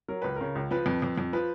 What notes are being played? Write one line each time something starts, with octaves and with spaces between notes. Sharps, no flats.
F#3 A#4
C#2 B4
C#3 A#4
C#2
F3 B4
F2
F2
F2
F3 B4